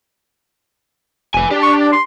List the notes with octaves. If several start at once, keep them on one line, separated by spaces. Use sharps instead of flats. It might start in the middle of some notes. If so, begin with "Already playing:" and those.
F1 B4 G#5
D4 G4
C#6
D5
C6